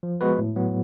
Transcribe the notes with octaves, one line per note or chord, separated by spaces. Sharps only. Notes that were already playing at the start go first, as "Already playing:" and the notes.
F3
G#3 B3 F#4 B4
A2
F#3 B3